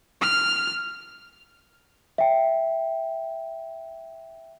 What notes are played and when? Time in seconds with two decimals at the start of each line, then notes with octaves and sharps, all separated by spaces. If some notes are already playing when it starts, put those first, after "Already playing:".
0.21 F6
2.18 E5 G5